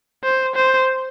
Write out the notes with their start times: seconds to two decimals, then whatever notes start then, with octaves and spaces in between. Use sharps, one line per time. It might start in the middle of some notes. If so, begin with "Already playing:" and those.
0.24 C5
0.55 C5